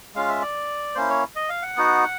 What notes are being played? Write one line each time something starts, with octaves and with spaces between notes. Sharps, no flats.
G#3 C#4 F4 F5
E5
D5
A#3 C#4 E4 C5
C#5
D#5
F5
F#5
B3 D#4 F#4